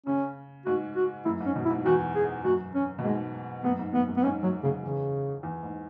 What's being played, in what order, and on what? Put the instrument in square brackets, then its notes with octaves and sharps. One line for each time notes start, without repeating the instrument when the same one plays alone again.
[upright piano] C#3 [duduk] C#4
[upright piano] G#2 [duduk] F#4
[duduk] F#4
[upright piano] F#2 [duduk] E4
[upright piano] G#2
[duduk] C#4
[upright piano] B2
[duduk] E4
[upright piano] G#2
[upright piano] E2 [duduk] F#4
[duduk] G#4
[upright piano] F#2 [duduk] F#4
[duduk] C#4
[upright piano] B2
[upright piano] G#2 [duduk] G#3
[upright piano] F#2 [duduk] B3
[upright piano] G#2
[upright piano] F#2 [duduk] B3
[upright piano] F#2
[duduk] B3
[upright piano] G#2 [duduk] C#4
[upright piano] F#2 [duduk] F#3
[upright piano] F#2 [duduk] C#3
[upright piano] E2 [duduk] C#3
[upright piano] E2
G#2